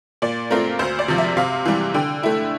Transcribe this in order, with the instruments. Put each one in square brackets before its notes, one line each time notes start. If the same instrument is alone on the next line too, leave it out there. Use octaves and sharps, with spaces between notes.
[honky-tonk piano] A#2 D5
A3 C4 F4 A#4
D2 C5
D5
C3 F3
E5
C3 F5
E3 G3
D3 G5
A3 E4